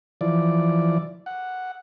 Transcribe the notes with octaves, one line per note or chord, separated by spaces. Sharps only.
E3 F3 D5
F#5